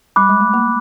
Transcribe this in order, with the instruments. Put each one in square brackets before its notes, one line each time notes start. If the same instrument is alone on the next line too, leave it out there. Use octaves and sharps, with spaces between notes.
[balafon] G3 [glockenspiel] B5 D6 F#6
[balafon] G#3
A3
A#3